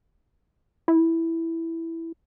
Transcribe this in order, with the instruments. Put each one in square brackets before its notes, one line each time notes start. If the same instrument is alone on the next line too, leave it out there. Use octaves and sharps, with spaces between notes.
[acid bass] E4